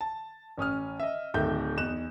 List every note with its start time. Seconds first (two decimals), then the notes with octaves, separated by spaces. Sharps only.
0.01 A5
0.58 A1 C#4 D#6 F6
1.00 D#5 E5
1.34 D1 D#3 A3 E5 G6
1.77 E2 D#4 F#6 E7